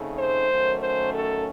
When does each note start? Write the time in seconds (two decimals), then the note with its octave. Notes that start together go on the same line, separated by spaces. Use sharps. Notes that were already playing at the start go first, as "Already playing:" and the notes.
Already playing: C#3 A3 C4 D#4
0.18 C5
0.49 F#2 D#3 A3 C#4
0.80 C5
1.12 A4